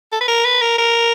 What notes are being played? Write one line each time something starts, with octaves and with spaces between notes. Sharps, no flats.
A4
B4
A#4
B4
A#4
A#4